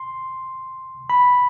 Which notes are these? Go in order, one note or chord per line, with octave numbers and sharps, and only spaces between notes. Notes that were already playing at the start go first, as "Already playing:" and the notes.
Already playing: C6
B5